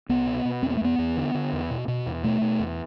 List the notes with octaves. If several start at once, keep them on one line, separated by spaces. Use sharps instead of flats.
C2 B3
B2
B2
E2 C4
B3
A3
E2 B3
E2
D3
D3
E2
B2
B2
E2
B2 A3
B2
E2